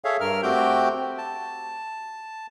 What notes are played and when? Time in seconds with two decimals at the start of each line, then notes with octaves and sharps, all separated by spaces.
0.04 G#4 A4 C#5 E5 F5
0.20 G2 A#4 F6
0.43 A3 C4 F#4 G4 G5 G6
1.18 A5